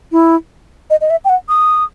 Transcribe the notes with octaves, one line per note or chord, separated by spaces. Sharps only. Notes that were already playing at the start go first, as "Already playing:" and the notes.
E4
D#5
D#5
E5
G5
F#5
D#6